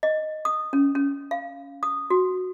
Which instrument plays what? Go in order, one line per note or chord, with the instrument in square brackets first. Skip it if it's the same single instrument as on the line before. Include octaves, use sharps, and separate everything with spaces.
[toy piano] D#5
D#6
C#4
C#4
F5
D#6
F#4